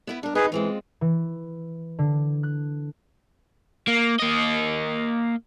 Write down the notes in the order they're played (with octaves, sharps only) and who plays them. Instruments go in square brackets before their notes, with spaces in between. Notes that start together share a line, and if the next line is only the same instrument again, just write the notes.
[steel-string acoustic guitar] B3 E4 B4
[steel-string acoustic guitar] G3 A#4 [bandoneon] D4
[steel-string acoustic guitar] D#4 [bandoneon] G#4 B4
[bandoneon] E3 [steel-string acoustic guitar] G#3 C4 F4
[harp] E3
D3
F#6
[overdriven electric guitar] A#3
A#3 D#5